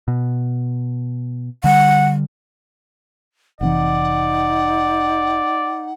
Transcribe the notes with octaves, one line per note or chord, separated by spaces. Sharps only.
B2
D3 G3 F#5
F1 C3 E3 D#4 D5 F#5